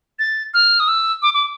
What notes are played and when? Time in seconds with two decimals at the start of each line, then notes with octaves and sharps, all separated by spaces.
0.19 A6
0.54 F6
0.80 D#6
0.88 E6
1.22 D6
1.34 D6